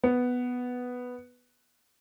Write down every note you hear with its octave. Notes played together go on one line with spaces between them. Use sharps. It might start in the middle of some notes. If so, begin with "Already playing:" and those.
B3